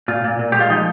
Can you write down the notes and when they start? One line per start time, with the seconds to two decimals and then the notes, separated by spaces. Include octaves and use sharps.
0.08 A#2 F4
0.24 A#2
0.39 A#2
0.52 G#3 G4
0.60 F4
0.70 F3 D#4